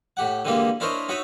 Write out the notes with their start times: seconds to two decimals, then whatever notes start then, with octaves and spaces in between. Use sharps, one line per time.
0.17 A2 G4 F#5
0.45 D3 E3 G3 G#3 A#3
0.80 D4 E4 A#4 C5 C#5 D#5
1.09 D#4 F#4 C#5 E5 D#6